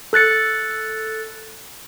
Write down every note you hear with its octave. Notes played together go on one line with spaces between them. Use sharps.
A4 F#6 A6 C#7